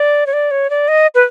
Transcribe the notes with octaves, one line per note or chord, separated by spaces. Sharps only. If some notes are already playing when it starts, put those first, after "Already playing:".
Already playing: D5
C#5
D5
C#5
D5
D#5
B4